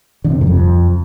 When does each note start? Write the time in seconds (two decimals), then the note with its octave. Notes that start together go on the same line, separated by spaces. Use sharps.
0.24 D3
0.30 C3
0.36 F2
0.41 F#2
0.47 F2